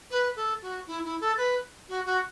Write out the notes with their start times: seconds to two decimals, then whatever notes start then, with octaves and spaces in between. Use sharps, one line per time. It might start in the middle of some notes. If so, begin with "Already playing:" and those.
0.11 B4
0.36 A4
0.62 F#4
0.87 E4
1.05 E4
1.21 A4
1.37 B4
1.89 F#4
2.05 F#4